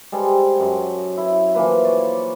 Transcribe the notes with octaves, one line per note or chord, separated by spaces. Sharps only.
G3 G#3 A4 C5
F#2 F#5
E4
E3 F3 A#3 B4
C#5 D5